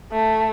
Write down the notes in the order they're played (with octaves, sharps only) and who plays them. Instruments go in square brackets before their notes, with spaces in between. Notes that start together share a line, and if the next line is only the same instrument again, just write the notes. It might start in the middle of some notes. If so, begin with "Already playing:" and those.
[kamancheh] A3